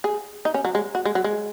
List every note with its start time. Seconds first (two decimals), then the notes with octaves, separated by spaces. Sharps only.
0.04 G#4
0.45 D#4
0.54 C#4
0.65 F#3
0.75 G#3
0.95 F#4
1.05 G#3
1.15 F#3
1.24 G#3